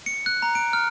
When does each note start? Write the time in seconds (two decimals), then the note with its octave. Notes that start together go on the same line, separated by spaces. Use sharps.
0.06 C#7
0.26 F#6
0.42 A#5
0.55 D7
0.73 F6